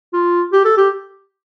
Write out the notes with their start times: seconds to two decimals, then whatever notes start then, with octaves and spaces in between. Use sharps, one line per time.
0.13 F4
0.53 G4
0.65 A4
0.77 G4